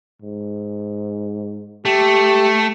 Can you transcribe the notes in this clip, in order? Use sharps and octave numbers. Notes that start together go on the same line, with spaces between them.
G#2
A3 G4